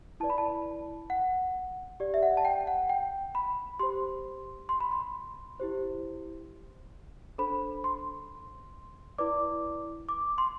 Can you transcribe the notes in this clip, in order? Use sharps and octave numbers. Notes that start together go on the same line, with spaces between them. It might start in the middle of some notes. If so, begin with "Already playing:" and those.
E4 B4 D5 A5
B5
A5
F#5
G4 D5
E5
F#5
A5
G5
F#5
G5
B5
G4 C5 C6
C6
B5
C6
E4 G4 C5
D4 A4 C5 B5
C6
E4 B4 D5 D6
D6
C6